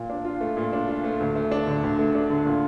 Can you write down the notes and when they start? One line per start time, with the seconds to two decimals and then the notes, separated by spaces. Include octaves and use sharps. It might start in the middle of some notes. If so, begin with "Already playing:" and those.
Already playing: A#2
0.10 D4
0.25 F4
0.41 A3
0.57 A#2
0.73 D4
0.88 F4
1.04 A3
1.20 D2
1.36 A3
1.51 D4
1.67 D3
1.83 D2
1.99 A3
2.15 D4
2.30 D3
2.46 A#2